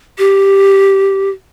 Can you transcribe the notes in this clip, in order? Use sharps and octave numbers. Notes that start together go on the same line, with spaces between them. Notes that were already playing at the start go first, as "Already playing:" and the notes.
G4